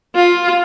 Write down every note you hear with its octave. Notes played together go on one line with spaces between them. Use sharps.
F4